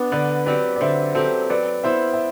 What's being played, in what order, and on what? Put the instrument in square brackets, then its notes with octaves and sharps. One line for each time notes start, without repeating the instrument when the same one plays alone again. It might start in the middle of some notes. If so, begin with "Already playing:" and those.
Already playing: [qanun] B3 D4
[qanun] D3 [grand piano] B4 D5
[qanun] F#3 C4 G4 [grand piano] B4 D5
[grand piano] D5
[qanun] D3 [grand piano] C5 E5
[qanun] F#3 C4 G4 [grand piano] A4 C5
[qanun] F#3 [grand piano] B4 D5
[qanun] B3 E4 B4 [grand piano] C5 E5
[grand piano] E5